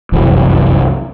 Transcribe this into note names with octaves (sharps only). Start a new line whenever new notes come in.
F1 C2 F#2 E3